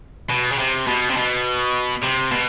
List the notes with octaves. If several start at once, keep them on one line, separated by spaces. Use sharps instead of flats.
B2
C#3
C3
B2
C3
B2
C3
B2